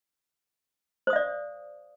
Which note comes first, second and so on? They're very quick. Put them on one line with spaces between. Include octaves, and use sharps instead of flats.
C5 D#6 F5 D5